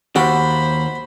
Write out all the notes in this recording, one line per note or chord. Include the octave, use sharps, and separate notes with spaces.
D#2 F#4 G4 C5 B5